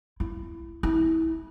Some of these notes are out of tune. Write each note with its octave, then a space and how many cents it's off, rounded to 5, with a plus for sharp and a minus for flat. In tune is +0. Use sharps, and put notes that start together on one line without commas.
E4 +20
E4 -25